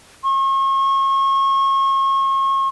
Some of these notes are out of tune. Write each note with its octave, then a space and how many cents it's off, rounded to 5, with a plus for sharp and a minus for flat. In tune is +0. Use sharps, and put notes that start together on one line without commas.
C#6 -35